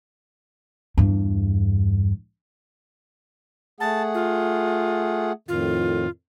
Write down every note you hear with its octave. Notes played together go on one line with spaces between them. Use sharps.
E2 G2
A3 G#4 F#5 A5
F4
F2 A2 D#3 F4